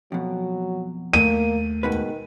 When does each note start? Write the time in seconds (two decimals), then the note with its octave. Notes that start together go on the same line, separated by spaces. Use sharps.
0.12 F2 B2 F#3
1.13 D#2 A3 A#3 D#7
1.83 G#2 B2 D#3 B4